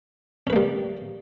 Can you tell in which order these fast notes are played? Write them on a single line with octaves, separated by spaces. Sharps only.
C#4 B4 A#3 G3